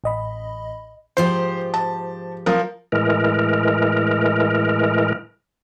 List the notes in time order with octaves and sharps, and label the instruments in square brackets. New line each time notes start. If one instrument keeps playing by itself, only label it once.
[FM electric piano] A1 D#5 B5
[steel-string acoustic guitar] G#2 F3 G4 [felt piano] C5
[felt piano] A5
F3 A#4
[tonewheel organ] A2 E3 G#3 A#4